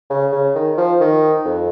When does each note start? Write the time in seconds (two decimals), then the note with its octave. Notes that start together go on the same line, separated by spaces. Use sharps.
0.10 C#3
0.32 C#3
0.55 D#3
0.77 F3
1.00 D#3
1.45 F2